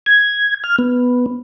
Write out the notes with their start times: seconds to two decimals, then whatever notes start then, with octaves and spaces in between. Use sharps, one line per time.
0.06 G#6
0.64 F6
0.78 B3